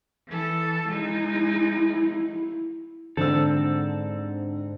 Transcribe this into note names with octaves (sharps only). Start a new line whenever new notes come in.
E3 A4
G#3 D#4 E4
G#2 D3 C4 A4 E6